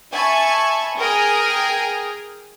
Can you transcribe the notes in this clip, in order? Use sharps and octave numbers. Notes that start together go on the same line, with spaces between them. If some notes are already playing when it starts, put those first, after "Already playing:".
E5 G#5 A5 B5 C#6
G#4 A#4 G5 G#5 D#6 F6